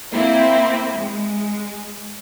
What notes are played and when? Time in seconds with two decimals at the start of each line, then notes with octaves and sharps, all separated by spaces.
0.13 A#3 C4 E4
0.97 G#3